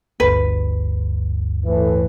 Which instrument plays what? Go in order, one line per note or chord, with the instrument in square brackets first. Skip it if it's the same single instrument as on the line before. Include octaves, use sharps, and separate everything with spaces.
[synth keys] G1 D2 G2 [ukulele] B4
[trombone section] A2 E3